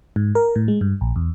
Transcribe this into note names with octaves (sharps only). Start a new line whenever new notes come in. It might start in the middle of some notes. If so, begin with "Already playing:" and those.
G#2
A#4
A2
G#3
G2
A#1
E2